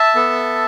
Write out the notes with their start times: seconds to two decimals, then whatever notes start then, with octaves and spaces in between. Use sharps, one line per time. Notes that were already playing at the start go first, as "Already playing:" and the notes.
Already playing: E5 A5
0.15 B3 A4